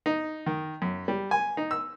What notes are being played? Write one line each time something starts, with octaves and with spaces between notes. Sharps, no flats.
D#4
D#3
F#2
G3
G#5
D#4
E6